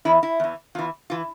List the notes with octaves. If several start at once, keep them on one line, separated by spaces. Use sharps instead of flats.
E2 E3 E4
E4
E2 E3
E2 E3 F4
E3 F4